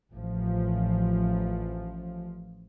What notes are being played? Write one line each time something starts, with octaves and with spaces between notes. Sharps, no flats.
A1 F3